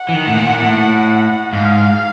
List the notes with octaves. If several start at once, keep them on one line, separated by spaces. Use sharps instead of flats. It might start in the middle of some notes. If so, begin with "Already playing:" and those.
Already playing: F#5
E3
D#3
A2
A#2
A2
G#2 F5